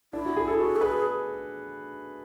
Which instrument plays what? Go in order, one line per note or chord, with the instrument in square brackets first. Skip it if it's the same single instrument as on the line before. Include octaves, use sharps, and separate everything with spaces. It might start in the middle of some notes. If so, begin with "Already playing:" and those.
[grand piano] D4 [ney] E4
[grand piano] F#4
G#4
A4
[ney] F#4 [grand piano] A4
[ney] A4
[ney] G#4 [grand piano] B4